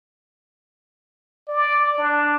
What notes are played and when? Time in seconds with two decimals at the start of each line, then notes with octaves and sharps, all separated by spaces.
1.48 D5
1.98 D4